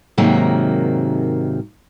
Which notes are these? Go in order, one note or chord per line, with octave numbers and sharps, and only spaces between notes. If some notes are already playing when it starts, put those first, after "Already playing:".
G#2 C3 D#3 F#3 A#3